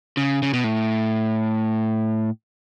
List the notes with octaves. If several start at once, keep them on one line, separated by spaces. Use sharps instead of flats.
C#3
C#3
B2
A2